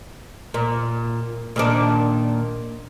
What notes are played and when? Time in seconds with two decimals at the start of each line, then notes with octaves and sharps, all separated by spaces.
0.54 A#2
1.56 A#2 D#3 D4